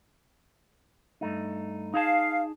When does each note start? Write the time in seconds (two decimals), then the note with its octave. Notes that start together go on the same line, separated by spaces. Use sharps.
1.21 G2 A3 D#4
1.94 D#4 G#4 F5 A5